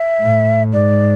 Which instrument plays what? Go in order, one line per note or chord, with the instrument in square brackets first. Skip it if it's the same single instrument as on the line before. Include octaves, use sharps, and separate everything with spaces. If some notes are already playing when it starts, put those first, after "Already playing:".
Already playing: [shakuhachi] E5
[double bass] A2
[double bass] G#2 [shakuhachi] D5